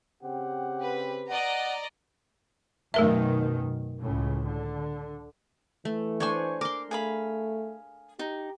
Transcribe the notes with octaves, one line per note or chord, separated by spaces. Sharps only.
C#3 C4 G4 F#5
B4
D5 D#5 F#5 A#5
F#2 B2 D#3 A3 A#4 E5
C#2 A2 C#3
D3
E3 A3
D4 C5 C#5 G#5 C#6
A#4 C6 D6
A3 G#4 F5 B5
D#4 G4